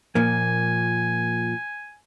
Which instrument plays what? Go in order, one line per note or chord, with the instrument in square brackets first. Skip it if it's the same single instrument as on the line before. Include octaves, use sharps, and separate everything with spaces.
[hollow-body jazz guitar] A#2 F3 A#3 [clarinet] G#5